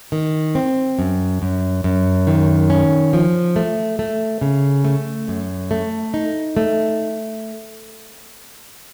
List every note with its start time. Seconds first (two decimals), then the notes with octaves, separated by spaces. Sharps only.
0.12 D#3
0.55 C4
0.99 F#2
1.42 F#2
1.84 F#2
2.27 D#3
2.70 C#4
3.13 F3
3.56 A3
3.99 A3
4.41 C#3
4.85 A3
5.28 F#2
5.71 A3
6.14 D#4
6.57 A3